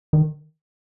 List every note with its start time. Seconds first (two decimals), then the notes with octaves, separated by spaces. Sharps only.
0.13 D#3